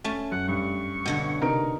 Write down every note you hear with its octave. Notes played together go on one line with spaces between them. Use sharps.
A3 C#4 A5
F#2 F#5
G2 C#6
B2 D3 C#5
C3 D#4 A#4 D7